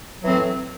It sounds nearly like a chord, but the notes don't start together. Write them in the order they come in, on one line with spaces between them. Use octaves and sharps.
F#3 E3 C4 A2